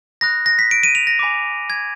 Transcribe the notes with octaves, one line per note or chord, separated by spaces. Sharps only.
B5 D#6 F#6 A#6
A#6
B6
D7
D#7
F7
A#6
G#5 B5 D6
G#6